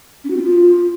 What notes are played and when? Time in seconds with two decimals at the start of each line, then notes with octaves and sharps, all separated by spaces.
0.24 C#4
0.30 F#4
0.36 C4
0.43 F4